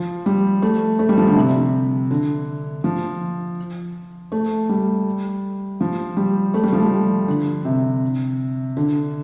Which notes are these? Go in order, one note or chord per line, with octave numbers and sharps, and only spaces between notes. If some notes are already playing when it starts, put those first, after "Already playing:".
Already playing: F3
G3
A3
A3
G3
F3
D3
C3
D3
F3
A3
G3
F3
G3
A3
G3
F3
G3
D3
C3
D3